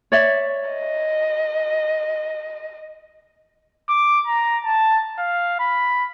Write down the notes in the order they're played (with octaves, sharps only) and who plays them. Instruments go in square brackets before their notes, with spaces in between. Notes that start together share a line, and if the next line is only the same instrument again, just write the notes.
[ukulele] C#5 D5 E5
[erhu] D#5
[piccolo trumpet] D6
A#5
A5
F5
B5